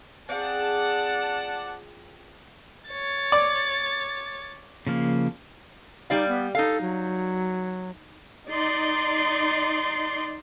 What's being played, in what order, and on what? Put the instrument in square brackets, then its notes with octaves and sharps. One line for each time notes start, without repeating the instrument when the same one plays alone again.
[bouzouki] C4 F4 G#4 [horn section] D5 F#5 A5
[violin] C#5 A6
[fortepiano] D5
[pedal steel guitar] C#3 F3 A#3
[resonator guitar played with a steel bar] G3 D5 F5 [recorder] D#4
[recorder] B3
[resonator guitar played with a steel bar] D#4 F5 [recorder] A4
[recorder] F#3
[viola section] D#4 D5 C6